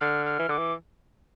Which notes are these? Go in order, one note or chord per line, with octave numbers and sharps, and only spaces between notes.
D3 F6
F6
E3
D3 D6
E3